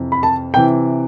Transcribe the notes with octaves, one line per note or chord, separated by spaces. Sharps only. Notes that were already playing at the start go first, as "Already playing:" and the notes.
Already playing: F2 C3 E3
B5
A5
C3 E3 G5